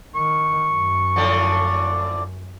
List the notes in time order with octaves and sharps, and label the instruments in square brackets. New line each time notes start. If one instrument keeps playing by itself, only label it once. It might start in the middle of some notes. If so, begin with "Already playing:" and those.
[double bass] D#3 [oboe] C#6
[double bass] F#2
[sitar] A2 D3 F3